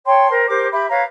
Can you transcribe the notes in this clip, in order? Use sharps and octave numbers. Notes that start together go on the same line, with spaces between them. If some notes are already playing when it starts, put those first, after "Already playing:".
C#5 G5 A5 C6
A#4 C5
G4 A#4 C5 D6
G4 E5 B5
B4 C#5 F5 A#5